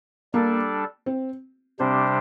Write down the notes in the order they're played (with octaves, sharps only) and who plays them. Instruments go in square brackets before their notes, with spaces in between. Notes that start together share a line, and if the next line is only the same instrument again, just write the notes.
[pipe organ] G3 D4 A4 D5 [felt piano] A#3
[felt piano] C4
[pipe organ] C3 G3 D4 G4 C5 [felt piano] C4